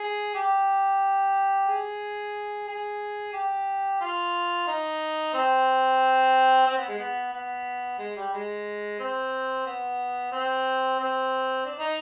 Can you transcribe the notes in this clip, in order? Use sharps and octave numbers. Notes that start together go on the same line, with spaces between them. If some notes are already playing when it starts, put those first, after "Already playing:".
Already playing: G#4
G4
G#4
G#4
G4
F4
D#4
C4
C4
B3
G#3
B3
B3
G#3
G3
G#3
C4
B3
C4
C4
D4
D#4